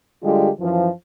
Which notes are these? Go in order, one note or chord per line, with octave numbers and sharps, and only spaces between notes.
D3 G3 G#3 F4 G4
F#2 E3 F3